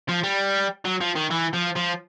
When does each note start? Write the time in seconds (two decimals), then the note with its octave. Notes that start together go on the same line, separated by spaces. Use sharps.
0.09 F3
0.23 G3
0.85 F#3
1.01 F3
1.15 D#3
1.30 E3
1.53 F3
1.76 F3